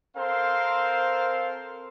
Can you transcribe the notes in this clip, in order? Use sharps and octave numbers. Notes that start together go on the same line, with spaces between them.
C4 A4 A#4 C5 F5 C6